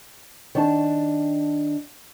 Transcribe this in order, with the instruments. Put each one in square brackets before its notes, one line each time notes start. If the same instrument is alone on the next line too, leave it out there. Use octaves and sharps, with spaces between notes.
[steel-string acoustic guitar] D#3 D4 A5